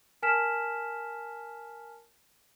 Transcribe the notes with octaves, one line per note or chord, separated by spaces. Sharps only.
A#4 G#5 A5 F6 B6 E7